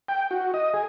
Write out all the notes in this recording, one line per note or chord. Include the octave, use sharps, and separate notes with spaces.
G5
F#4
D#5
G#4